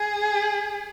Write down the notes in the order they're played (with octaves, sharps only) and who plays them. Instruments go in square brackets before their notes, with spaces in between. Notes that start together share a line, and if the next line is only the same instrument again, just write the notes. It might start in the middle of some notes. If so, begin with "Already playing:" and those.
Already playing: [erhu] G#4